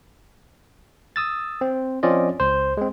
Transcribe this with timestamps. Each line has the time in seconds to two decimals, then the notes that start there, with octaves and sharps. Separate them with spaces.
1.16 D#6 E6 A6
1.61 C4
2.03 F3 C4 C#4 F4 D5 D#5
2.40 C#2 C5
2.77 G#3 C4